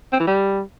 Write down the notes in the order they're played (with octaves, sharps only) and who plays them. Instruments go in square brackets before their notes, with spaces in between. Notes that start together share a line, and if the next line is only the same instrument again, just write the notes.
[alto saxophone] C4
E3
G3